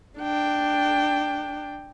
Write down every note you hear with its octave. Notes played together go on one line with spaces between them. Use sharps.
D4 G5